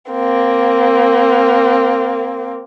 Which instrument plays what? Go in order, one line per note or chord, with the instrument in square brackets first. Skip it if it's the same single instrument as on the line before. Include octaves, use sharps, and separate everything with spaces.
[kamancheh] A#3 C4